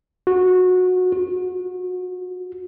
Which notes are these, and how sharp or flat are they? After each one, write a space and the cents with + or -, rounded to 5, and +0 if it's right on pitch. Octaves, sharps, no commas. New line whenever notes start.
F#4 -20
F#4 -30